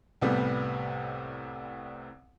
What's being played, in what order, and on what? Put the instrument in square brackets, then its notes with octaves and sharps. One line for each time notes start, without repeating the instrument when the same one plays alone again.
[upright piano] C2 A2 C3 G3 B3